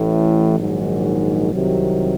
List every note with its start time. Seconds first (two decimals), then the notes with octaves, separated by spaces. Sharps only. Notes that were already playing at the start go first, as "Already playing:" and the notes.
Already playing: A1 A2 E3
0.60 A#1 G#2 D#3 F#3
1.52 C2 C3 D#3 F#3